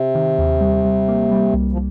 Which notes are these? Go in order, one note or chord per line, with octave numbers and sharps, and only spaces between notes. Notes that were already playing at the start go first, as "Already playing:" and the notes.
Already playing: C3
D#3
D#2
G3
G3
A#3
G3
C2
F3